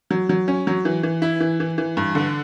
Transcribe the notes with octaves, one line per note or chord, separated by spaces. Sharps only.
F#3
F#3
C#4
F#3
E3
E3
E4
E3
E3
E3
G2
D3